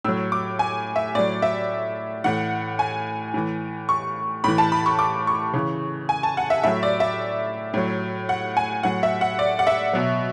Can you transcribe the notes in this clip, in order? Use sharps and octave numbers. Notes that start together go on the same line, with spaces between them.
A2 F#3 E6
D6
G#5
E5
A2 F#3 D5
E5
A2 E3 F#5
G#5
A2 E3
C#6
A2 E3 B5
A5
B5
C#6
D6
C#6
C#3 E3
G#5
A5
F#5
E5
A2 F#3 E5
D5
E5
A2 F#3
F#5
G#5
A2 F#3 F#5
E5
F#5
D5
F#5
E5
B2 F#3